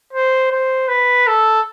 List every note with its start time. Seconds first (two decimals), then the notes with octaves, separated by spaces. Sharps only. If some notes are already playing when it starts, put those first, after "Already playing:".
0.13 C5
0.51 C5
0.88 B4
1.27 A4